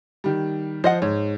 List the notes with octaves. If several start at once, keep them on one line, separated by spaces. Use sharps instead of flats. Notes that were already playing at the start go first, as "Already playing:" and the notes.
D#3 G3
F3 C5 D#5 F#5
G#2 C#5